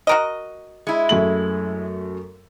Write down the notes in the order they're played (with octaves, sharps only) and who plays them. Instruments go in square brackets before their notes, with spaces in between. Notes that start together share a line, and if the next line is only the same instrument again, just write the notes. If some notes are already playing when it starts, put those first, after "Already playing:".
[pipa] F#4 A#4 D#5
[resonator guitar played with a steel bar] G#3 E4
[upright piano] F#2 A3 F#7